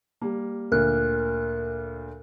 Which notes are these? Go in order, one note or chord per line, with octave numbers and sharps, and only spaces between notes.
G3 A#3
D2 A#2 A#4 F#6